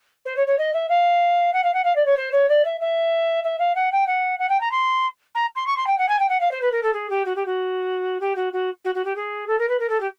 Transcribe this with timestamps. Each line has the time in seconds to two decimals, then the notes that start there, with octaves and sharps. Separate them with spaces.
0.25 C5
0.36 C#5
0.47 C#5
0.58 D#5
0.73 E5
0.89 F5
1.53 F#5
1.64 F5
1.74 F#5
1.84 F5
1.96 D5
2.06 C#5
2.17 C5
2.32 C#5
2.49 D5
2.65 E5
2.80 E5
3.44 E5
3.59 F5
3.75 F#5
3.92 G5
4.07 F#5
4.39 F#5
4.49 G5
4.61 A#5
4.71 C6
5.35 A#5
5.55 C6
5.66 C#6
5.77 C6
5.87 G5
5.98 F#5
6.08 G#5
6.19 G5
6.29 F#5
6.40 F5
6.51 C5
6.62 B4
6.72 A#4
6.83 A4
6.93 G#4
7.10 G4
7.25 F#4
7.35 G4
7.46 F#4
8.20 G4
8.36 F#4
8.53 F#4
8.84 F#4
8.95 F#4
9.05 G4
9.16 G#4
9.47 A4
9.59 A#4
9.69 B4
9.79 A#4
9.89 A4
10.00 G4